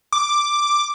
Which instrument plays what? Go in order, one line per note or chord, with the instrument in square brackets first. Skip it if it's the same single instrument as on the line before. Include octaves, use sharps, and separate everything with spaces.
[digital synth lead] D6